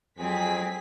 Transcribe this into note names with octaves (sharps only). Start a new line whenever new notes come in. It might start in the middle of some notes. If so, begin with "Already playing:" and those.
F2 F#3 C4 G#4 B6